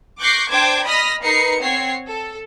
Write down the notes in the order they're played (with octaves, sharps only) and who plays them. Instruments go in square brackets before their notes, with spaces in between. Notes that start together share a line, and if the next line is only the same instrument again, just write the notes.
[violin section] C#6 D6 F#6 G6 A#6 C7
D4 C5 G5 A5 D6 G#6
D#5 B5 D#6 F6 A#6 B6
D#4 A#4 B4 A#5 C7 C#7
C4 C#5 F#5 C7
A4